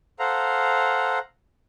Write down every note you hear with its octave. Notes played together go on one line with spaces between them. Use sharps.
A4 C5 F5 F#5 A#5